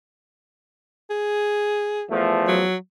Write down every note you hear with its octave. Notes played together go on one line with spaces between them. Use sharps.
G#4
E2 F3 A3
F#3